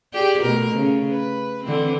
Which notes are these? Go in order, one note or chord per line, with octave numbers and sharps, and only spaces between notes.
G4 G#4 D5
B2 A3 A#4
C#3
B4
D3 E3 C4